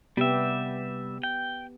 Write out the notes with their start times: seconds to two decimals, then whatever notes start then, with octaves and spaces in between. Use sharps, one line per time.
0.17 C3 G3 B3 G4 E5
1.23 G5